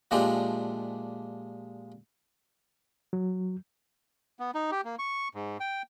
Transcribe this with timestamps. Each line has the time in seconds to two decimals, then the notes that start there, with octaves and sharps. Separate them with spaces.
0.11 A#2 F3 G#3 A3 D4 G4
3.13 F#3
4.40 B3
4.55 D#4
4.72 G4
4.85 A#3
4.99 C#6
5.35 G#2
5.60 G5